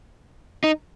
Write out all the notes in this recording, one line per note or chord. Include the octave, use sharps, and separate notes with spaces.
D#4